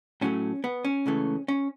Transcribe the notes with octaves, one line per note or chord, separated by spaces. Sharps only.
A2 F#3 A3 C#4
B3
C#4
C#2 C#3 E3 A3
C#4